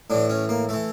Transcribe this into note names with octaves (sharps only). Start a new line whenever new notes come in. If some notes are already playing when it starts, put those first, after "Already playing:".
A2 E3 D4
C#4
A#3
E3 A3